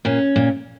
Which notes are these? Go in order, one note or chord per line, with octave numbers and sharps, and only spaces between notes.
A#2 C#4
A#2